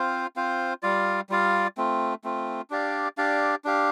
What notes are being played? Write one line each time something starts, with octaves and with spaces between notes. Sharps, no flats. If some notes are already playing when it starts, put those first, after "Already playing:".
Already playing: C4 F4 C5 F5
C4 F4 C5 F5
G3 F4 D5 F5
G3 F4 D5 F5
A3 C4 F4
A3 C4 F4
D4 G4 D5 F5
D4 G4 D5 F5
D4 G4 F5